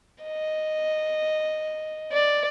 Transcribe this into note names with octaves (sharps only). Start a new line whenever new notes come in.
D#5
D5